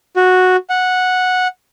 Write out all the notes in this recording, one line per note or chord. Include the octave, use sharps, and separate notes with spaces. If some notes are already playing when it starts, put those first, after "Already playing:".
F#4
F#5